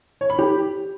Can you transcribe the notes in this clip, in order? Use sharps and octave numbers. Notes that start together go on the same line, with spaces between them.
C#5
B5
G4